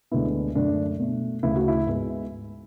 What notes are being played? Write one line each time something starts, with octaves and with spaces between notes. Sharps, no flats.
D2 D3 G#3 B3 E4
F#2 D3 A3 D4
B2 A3
D2 C#3 E3 A3 E4
F#4
E4
G#2 G#3 B3